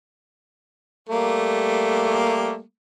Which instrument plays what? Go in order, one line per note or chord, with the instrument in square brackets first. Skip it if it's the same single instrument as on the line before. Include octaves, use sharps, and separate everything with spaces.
[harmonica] G3 A3 A#3